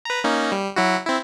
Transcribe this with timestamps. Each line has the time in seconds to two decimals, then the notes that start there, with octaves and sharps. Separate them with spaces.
0.05 B4 A#5
0.24 A#3 C#4 D#4
0.52 G3
0.76 F#3 E4 F#4
1.05 C4 E4